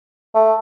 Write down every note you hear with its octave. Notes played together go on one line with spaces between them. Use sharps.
A3